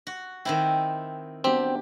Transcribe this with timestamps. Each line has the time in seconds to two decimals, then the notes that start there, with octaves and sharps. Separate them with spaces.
0.07 F#4
0.45 D#3 C4 E4 G5 E6
1.44 B3 C4 D4 F#4 G4